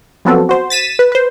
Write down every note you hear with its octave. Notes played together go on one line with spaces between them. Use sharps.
F3 F#3 B3 C4 F#4 A4
F#4 C5
A6 B6 D#7 E7
B4
B4 C5